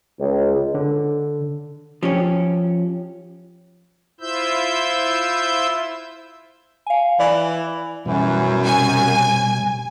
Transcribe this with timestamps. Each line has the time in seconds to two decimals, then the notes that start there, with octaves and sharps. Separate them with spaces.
0.20 C#2
0.74 D3
2.03 F3 C#4 G4 C#5
4.20 E4 F4 C5 E5 E6 G6
6.87 F5 G#5
7.19 E3 D5
8.06 F#2 B2 E3 G3
8.64 C3 G#5